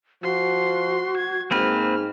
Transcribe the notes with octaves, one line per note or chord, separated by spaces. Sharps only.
F3 F#4 C6
G#6
G#2 A#3 C4 B4 F6